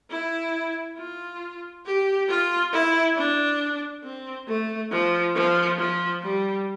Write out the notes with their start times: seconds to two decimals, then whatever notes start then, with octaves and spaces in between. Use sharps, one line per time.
0.10 E4
0.97 F4
1.85 G4
2.29 F4
2.72 E4
3.16 D4
4.04 C4
4.47 A3
4.91 F3
5.35 F3
5.78 F3
6.22 G3